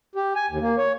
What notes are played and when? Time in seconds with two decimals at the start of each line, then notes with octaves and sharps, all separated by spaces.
0.15 G4
0.36 G#5
0.50 D#2
0.61 A#3
0.78 C#5